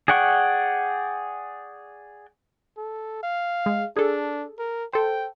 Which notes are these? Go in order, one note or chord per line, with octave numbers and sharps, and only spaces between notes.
G#4 D5 F#5 G5 C#6
A4
F5
G#3
D4 G#4 A4
A#4
A4 C5 G5